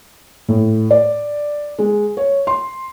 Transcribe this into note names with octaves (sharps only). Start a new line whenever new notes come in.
A2
D5
G#3
C#5
C6